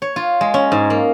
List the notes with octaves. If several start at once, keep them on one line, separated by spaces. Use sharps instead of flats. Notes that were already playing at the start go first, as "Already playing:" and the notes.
C#5
F4
G#3
C#4
G#2
A#3